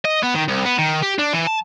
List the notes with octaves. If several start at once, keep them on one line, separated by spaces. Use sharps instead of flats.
D#5
B3
D#3
C2
B3
D#3
G4
D4
E3
A5